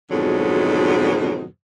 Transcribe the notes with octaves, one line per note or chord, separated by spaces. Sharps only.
F2 G#2 B2 D3 D#3 F#3